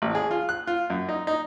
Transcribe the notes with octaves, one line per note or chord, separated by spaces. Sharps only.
A1
G#4
F4
F#6
F4
F#2
D#4
D#4